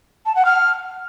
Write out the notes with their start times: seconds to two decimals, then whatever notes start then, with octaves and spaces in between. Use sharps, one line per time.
0.26 A5
0.35 F#5
0.45 F6